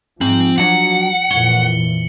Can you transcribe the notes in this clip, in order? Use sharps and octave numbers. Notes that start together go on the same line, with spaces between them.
G#2 F3 C4 F#7
F#3 D4 F#4 F#5 C#7 F#7
F2 A#2 E3 C#5 G7